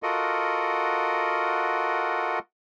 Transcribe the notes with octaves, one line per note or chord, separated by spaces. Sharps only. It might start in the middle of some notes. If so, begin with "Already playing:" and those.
F4 F#4 A4 A#4 D#5 F#5